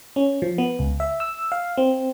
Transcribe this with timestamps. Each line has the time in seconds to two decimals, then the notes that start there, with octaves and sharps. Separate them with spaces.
0.16 C#4
0.42 F3
0.58 B3
0.79 C#2
1.00 E5
1.20 E6
1.52 F5
1.77 C4